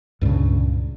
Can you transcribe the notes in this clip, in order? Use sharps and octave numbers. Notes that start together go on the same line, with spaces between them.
C#2 G2 A#2 C#3